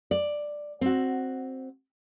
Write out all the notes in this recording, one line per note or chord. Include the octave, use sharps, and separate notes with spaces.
D5
C4 F#4